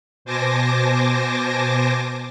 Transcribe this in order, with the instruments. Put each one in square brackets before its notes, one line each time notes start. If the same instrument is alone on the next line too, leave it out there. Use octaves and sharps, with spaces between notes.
[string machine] B2 C5 G#5 A5 D6 A#6